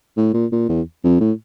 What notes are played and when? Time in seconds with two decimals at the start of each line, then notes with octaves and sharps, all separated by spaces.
0.17 A2
0.33 A#2
0.52 A#2
0.69 E2
1.04 F2
1.20 A2